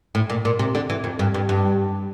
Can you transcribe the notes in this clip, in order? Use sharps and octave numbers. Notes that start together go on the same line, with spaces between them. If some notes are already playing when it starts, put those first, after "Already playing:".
A2
A#2
A#2
C3
D3
E3
F2
G2
G2
G2